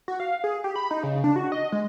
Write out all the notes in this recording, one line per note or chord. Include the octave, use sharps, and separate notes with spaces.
F#4
F5
G#4
G4
B5
D#4
C#3
D4
F#4
D#5
G#3